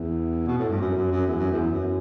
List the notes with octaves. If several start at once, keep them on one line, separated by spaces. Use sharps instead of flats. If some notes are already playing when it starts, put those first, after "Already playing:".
Already playing: E2
B2
A2
G2
F#2
F#2
F#2
E2
F#2
E2
F#2